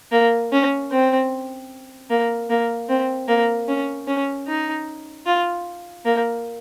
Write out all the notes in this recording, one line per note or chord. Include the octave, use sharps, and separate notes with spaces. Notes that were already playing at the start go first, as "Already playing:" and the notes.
A#3
C#4
C4
A#3
A#3
C4
A#3
C#4
C#4
D#4
F4
A#3